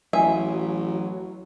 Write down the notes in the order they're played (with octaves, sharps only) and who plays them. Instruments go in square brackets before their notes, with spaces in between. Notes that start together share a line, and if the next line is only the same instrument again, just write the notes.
[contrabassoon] A1 [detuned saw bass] F#3 [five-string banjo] E5 [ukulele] F5 G#5